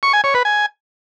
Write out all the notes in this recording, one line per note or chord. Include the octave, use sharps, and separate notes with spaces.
C#6
G#5
C#5
B4
G#5